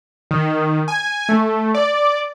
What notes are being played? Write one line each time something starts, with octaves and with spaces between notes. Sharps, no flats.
D#3
G#5
A3
D5